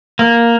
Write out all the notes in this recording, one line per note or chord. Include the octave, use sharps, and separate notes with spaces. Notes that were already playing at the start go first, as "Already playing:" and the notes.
A#3